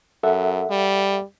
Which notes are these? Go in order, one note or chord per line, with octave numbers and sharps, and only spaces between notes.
F#2 A4 E5 F#5
G3